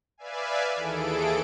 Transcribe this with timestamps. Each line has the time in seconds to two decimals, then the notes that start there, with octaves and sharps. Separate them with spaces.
0.18 B4 D5 E5 F5 G#5
0.75 D#2 E3 G#4 A4 D7